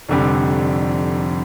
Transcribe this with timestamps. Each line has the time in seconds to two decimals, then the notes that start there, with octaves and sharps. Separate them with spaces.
0.08 F1 F2 D3 G3